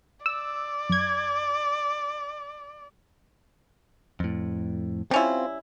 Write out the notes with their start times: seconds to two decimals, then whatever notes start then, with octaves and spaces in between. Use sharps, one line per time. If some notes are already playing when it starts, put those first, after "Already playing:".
0.26 D5 E6
0.89 F#2 G#6
4.20 F2 A2
5.11 G3 C4 C#4 E4 F4